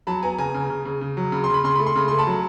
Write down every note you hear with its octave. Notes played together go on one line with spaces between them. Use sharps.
F#3 A5 B5
B3 G#5 A#5
C#3 G#5 A#5
C#3
C#3
C#3
C#3
F#3
C#3 B5
C6
C#3
B5
C#3 C6
A3 B5
C6
C#3 B5
A3 C6
A5 B5
F#3